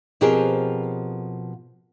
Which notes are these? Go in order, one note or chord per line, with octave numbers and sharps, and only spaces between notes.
B2 F3 C4 G4 G#4 A#4